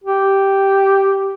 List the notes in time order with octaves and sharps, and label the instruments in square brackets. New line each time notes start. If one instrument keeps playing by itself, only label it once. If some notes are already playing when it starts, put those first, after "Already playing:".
[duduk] G4